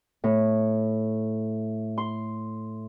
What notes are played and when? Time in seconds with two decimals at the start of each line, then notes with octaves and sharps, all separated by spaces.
0.24 A2
1.98 C6